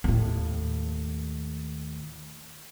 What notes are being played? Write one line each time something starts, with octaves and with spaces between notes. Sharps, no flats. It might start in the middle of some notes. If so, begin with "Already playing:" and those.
D#2 A2